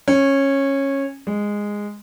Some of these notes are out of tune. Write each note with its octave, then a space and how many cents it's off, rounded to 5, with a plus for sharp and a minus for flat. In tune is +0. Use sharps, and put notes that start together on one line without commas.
C#4 -15
G#3 -10